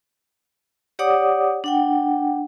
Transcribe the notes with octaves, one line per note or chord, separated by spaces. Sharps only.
G4 C#5 D5 F#5 D6 D#6
D4 F#5 G5